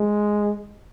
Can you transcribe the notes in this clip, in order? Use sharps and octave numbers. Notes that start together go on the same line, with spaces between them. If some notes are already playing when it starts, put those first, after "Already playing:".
Already playing: G#3